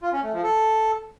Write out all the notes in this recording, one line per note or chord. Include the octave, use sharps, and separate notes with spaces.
F4
C#4
A3
F3
A4